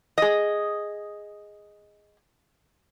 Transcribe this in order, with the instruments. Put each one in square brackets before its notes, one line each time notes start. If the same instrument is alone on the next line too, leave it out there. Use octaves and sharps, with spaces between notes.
[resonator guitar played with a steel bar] G#4 D#5